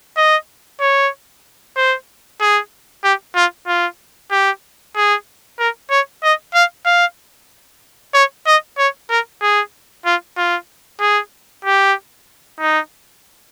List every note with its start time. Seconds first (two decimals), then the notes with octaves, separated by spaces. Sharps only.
0.17 D#5
0.81 C#5
1.76 C5
2.41 G#4
3.04 G4
3.36 F4
3.67 F4
4.31 G4
4.96 G#4
5.59 A#4
5.91 C#5
6.23 D#5
6.54 F5
6.86 F5
8.14 C#5
8.46 D#5
8.78 C#5
9.10 A#4
9.42 G#4
10.06 F4
10.37 F4
11.01 G#4
11.65 G4
12.60 D#4